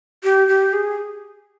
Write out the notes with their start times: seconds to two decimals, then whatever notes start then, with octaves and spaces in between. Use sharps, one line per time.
0.24 G4
0.48 G4
0.73 G#4